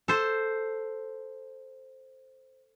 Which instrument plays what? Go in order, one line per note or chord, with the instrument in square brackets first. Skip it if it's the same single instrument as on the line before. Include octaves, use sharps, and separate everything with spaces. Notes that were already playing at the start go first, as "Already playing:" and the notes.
[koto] A4 C5